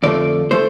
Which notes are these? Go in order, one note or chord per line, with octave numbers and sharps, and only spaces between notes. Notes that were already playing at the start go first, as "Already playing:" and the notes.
F2 D3 F3 A3 D5
F3 A3 C5